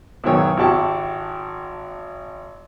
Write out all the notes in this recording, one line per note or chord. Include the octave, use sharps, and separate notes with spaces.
B1 E2 G#2 D#3 C#5 E6
G#1 E4 G4 F#5 A5 C#6